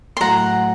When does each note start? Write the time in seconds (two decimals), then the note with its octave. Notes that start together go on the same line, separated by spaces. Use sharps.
0.17 C6
0.21 A2 F#3 A3 F#5 A#5